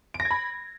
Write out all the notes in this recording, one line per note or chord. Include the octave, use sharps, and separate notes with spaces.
D7
A#6
G#6
B5